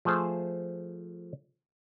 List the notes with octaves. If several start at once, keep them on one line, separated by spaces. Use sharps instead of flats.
F3 A3 G#4 C5 A5